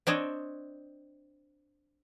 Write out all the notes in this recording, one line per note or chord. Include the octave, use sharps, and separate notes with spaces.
C4 D4 C#5 D#5